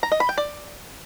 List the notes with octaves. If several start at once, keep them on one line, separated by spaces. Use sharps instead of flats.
A#5
D#5
B5
G5
D5